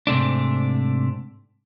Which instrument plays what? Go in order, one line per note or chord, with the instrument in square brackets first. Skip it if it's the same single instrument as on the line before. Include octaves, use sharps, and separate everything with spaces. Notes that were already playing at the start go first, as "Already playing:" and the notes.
[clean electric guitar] G#2 C3 A3 D4